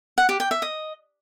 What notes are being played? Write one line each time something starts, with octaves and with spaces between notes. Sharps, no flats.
F#5
G4
G5
E5
D#5